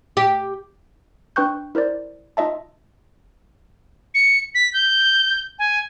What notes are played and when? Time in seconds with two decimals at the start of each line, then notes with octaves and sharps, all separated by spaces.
0.17 G4
1.36 D4 B4 G5 C#6 F#6 G6
1.75 E4 A#4 C5 D5
2.37 D#4 F4 D#5 E5 A5
4.15 C#7
4.55 B6
4.74 G6
5.59 G#5